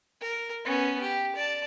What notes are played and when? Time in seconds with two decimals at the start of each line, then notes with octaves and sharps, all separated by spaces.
0.21 A#4
0.64 B3 C#4
1.01 G4
1.36 D5 A5